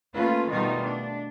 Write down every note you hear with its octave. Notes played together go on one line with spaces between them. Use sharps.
A3 A#3 C#4 F4 B4
B2 D#3 G3 A3 D#4 F4
D4